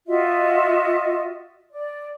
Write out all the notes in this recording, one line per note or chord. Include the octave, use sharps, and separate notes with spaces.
F4 F#4 D#5 E5
D5